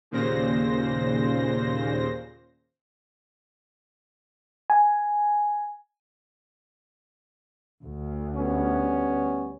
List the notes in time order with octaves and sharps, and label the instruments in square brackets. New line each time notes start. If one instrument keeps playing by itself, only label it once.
[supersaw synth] D#2 A#2 C#3 C5 A#6
[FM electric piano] G#5
[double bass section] D2
[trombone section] G3 B3 C#4